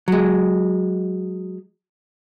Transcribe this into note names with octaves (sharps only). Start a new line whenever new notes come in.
F#3 G#3